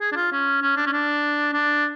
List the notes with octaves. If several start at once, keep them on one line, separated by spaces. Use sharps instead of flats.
G#4
D4
F4
C#4
C#4
D4
C#4
D4
D4